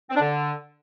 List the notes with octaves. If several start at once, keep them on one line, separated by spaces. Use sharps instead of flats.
C4
D4
D3